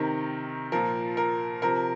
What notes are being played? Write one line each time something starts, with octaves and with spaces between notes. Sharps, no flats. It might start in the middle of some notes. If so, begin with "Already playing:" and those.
Already playing: C3 D#3 A#4
A#2 F3 A#4
A#4
C3 F3 A#4